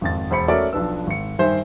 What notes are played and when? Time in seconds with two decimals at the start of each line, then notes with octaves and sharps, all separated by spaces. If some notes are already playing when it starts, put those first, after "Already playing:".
0.01 G#1 F2 A6
0.31 E1 C5 B5 C#7
0.48 A3 C#4 F#4 A#4 D5 E5
0.73 B1 F3 D4 B4 E6
1.07 G#1 C#7
1.38 G2 D#3 C5 E5 G#5